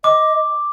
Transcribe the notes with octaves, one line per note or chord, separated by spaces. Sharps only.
D#5 D6